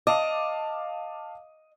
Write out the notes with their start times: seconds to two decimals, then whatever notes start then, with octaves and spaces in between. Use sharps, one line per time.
0.07 D#5 F5 A5 D6